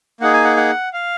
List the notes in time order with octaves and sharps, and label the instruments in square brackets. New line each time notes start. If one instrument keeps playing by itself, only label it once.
[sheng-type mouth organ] A#3 D#4 G#4 F#5
G#5
F#5
F#5
F5